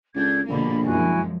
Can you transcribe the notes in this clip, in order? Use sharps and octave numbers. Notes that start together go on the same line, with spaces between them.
C#2 D4 A4 G6 G#6
A#1 B2 D3 A#3 B5
F#2 F3 G#3 E4 F#4 G#5